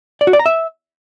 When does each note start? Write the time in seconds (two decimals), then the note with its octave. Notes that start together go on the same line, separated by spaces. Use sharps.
0.21 D5
0.27 F#4
0.33 D5
0.39 A#5
0.46 E5